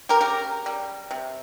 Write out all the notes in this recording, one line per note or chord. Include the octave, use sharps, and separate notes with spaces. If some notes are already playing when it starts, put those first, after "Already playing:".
G4 A#4
C#3 G4 A#4
G3
C3